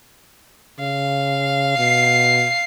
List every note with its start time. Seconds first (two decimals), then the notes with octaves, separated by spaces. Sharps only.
0.80 C#3 F5
1.78 B2 C7